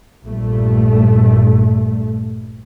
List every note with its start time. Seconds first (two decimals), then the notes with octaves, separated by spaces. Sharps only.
0.24 A#1 G2 A3